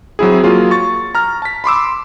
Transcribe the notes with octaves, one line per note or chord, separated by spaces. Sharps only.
F#3 C4 E4 G#4
F#3 A#3 F4 G#4
C#6 A6
A#5 F6
A5 B6
B5 C6 D6 E6